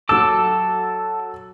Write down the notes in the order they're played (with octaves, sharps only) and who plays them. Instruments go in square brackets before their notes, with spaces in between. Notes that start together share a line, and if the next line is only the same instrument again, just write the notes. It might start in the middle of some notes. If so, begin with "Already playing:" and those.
[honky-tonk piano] F#3 E6 [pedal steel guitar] A4 A5 D6